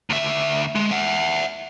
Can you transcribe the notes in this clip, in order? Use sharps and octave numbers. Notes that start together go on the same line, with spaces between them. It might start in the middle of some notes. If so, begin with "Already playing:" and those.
D2 E5
G#3
E5 F#5